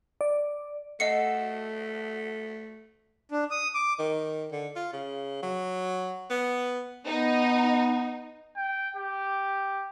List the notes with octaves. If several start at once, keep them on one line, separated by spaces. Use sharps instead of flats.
D5
A3 F#4 A4 D#5 C7 C#7
D4
D#6
D6
D#3
D3
F4
C#3
F#3
B3
B3 D#4
G5
G4